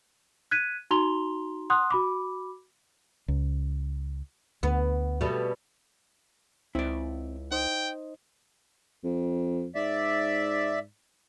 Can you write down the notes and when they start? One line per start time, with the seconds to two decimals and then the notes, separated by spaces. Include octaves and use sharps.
0.51 F#6 G#6 B6 D#7
0.91 D#4 F#4 A#5 C6 F7 G7
1.70 F#5 C6 D#6 F#6
1.90 F#4 B5 D6
3.28 C#2
4.63 D2 B3
5.21 B2 G3 A3
6.75 C#2 C4 E4 D5
7.52 D#4 C5 D#5 G5
9.04 F2
9.75 G#2 D5 E5